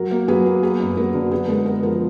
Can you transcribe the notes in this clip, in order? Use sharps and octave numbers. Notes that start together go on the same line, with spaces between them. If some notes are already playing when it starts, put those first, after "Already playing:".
Already playing: F#3 A#4
A#3
F#3 G#4 B4
A#3
B3 G#4 B4
F#2
F#3 A#4
D3
B3 G#4
G#3 A#4
B3 A#4
F3 A#4